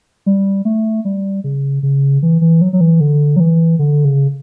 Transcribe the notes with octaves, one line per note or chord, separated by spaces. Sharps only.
G3
A3
G3
C#3
C#3
E3
E3
F#3
F#3
E3
D3
F#3
E3
D3
C#3